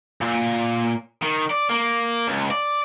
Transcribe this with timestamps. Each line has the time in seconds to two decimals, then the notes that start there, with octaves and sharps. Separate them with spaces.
0.21 A#2
1.22 D#3
1.50 D5
1.70 A#3
2.28 C#2
2.50 D5